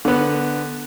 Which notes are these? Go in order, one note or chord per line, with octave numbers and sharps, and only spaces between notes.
D3 B3